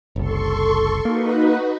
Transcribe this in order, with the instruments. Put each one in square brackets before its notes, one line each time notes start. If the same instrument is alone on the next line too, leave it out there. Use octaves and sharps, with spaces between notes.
[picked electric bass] F#1 C2 [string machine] A4 C6 C#6
[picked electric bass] A#3 [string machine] D#4 F#4 B4